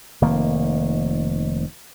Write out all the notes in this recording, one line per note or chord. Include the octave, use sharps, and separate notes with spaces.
F1 D#3 A#3